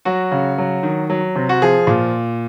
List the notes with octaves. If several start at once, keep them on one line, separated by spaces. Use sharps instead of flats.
F#3 F#4
C#3
F#3
D#3
F#3
C3
F#4
F3 G#4
A#2